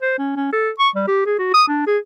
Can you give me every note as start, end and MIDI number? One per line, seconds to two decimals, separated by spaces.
0.02 0.17 72
0.18 0.34 61
0.36 0.52 61
0.52 0.70 69
0.79 0.89 85
0.95 1.05 55
1.07 1.23 67
1.26 1.37 68
1.39 1.50 66
1.54 1.66 87
1.68 1.84 62
1.87 1.98 68